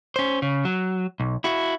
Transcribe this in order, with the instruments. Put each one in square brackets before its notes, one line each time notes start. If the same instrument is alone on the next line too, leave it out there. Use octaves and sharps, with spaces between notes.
[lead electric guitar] C#4 C5
C#3
F#3
B1
E4 F#4